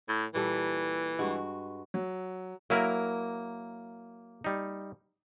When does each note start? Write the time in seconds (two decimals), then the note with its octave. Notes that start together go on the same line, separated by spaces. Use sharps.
0.09 A2
0.35 A#2 E3 G3 A4
1.19 G2 G#3 F#4
1.94 F#3
2.70 F#3 A#3 E4 A#4
4.44 G3 D#4